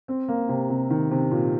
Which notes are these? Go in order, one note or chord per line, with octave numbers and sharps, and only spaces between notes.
C4
A#3
C3
C3
D#3
C3
A#2